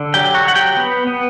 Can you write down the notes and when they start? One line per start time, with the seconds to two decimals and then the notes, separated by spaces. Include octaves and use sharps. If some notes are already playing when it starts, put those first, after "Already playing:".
Already playing: D3
0.14 F#3 G4 G5
0.34 F#4 F#5
0.45 F#3 F#5
0.55 G4 G5
0.77 B3
1.07 B3